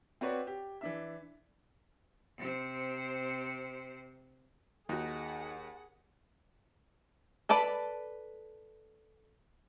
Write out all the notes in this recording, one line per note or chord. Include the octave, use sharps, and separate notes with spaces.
C4 F#4 B4 C#5 D5
G4
E3 D4 E5
C3 C5
D#2 D#4 F#4 G#4 F#5
A4 B4 D5 A5 B5